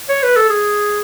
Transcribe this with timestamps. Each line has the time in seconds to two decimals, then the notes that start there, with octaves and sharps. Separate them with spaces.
0.09 C#5
0.23 B4
0.36 A4
0.50 G#4